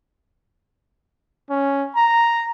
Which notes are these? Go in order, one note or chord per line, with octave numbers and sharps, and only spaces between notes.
C#4
A#5